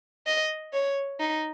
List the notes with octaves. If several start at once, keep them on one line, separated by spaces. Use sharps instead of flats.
D#5
C#5
D#4